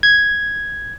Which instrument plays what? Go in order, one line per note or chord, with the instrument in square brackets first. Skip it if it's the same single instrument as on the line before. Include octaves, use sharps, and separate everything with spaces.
[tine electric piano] G#6